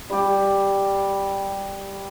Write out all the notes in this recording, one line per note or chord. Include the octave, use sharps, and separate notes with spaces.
G3 G4